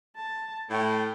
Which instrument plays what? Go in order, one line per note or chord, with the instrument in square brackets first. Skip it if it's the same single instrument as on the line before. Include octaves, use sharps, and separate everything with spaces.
[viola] A5
[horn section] A2 [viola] G5